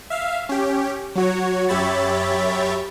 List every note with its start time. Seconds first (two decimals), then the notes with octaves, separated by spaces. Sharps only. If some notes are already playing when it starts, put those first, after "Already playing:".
0.10 E5 F5
0.49 C#4 G4
1.15 F#3 F#4 C#5
1.69 F#2 G4 C#5 E5 B5 A6